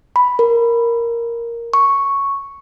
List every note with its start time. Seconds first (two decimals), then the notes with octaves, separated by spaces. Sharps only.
0.16 B5
0.39 A#4
1.74 C#6